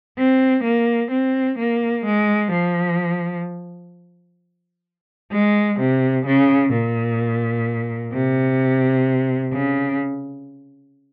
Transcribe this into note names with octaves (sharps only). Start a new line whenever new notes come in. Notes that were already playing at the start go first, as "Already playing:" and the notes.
C4
A#3
C4
A#3
G#3
F3
G#3
C3
C#3
A#2
C3
C#3